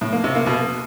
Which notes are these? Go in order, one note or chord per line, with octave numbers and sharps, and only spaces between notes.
A2
A#3
C3
A#3
B2